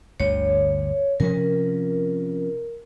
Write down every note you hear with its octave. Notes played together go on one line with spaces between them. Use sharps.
G1 D2 C#5
C3 F3 C#4 A#4